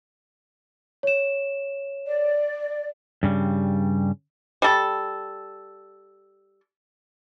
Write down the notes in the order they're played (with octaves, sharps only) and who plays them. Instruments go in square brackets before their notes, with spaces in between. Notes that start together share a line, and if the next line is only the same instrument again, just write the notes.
[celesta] C#5 E7
[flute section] D5
[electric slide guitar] G2 C#3 G3
[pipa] G3 A4